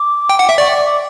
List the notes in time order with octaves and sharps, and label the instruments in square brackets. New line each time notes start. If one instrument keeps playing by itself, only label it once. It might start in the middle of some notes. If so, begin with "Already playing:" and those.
Already playing: [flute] D6
[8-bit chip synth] G5
F#5
E5
[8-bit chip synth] D5 [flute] C#6
[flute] D6
D6